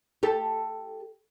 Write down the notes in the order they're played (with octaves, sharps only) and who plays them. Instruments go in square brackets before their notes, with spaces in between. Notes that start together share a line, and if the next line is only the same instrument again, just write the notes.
[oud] G4 A4